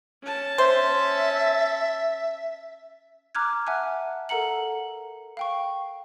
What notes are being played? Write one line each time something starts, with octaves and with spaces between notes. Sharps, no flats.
C#4 A5
C5 E5
A#5 D6 F6 F#6 G#6
E5 F#5 G#5 A5 F#6
A4 A#4 F#5 A#5 C#7 F#7
F5 G5 C#6